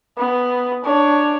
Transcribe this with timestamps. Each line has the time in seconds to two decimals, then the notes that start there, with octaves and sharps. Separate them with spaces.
0.18 B3
0.84 D4 C#5